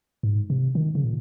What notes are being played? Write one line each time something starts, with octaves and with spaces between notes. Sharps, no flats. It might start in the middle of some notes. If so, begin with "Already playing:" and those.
G#2
C3
D#3
C#3
A#2